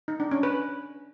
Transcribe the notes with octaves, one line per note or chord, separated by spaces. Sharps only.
D#4
D4
C#4
B4